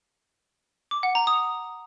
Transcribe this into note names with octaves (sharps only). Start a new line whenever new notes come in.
D6
F#5
A#5
D#6